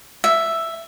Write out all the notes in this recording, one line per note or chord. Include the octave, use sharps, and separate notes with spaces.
E5